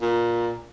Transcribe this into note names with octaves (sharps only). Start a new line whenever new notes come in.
A#2